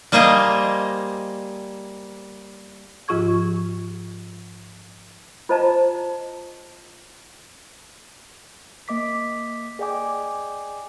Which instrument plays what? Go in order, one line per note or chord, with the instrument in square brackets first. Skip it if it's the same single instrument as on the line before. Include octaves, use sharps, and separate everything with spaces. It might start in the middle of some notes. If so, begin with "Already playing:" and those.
[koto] G3 A#3 G#4 C5 D#5
[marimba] G#2 F3 F4 G#4 C#6 G#6
[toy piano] F4 C5 D5 D#5 A5 A#5
[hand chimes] A#3 D#5 D6 B6
G#4 D5 D#5 G5 G#5 D6